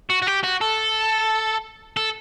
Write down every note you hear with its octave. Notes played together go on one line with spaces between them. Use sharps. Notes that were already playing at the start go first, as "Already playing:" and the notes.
F#4
F#4
G4
F#4
A4
A4